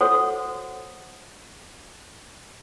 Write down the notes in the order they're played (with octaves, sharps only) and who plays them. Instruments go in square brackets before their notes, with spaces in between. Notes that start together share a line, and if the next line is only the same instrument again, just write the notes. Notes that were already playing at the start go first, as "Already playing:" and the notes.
[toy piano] F#4 A4 C5 C#5 F#5